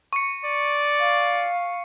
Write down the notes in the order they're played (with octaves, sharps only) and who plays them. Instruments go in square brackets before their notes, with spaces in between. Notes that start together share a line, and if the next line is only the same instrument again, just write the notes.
[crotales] C#6 C#7
[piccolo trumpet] D5
[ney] F5